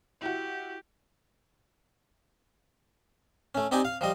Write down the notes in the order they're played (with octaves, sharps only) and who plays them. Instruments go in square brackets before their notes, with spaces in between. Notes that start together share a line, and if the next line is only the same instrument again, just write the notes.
[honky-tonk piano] E4 F#4 [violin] G4
[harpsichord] A3 C#4
C4 D#4 G4 D5 G#5
F5
F3 G3 D#5